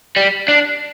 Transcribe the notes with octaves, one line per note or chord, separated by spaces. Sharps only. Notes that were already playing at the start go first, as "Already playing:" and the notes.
G3
D4